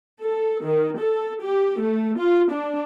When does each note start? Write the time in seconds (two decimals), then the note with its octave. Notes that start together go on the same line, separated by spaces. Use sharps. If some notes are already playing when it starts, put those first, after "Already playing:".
0.21 A4
0.63 D#3
0.98 A4
1.42 G4
1.81 A3
2.18 F4
2.52 D4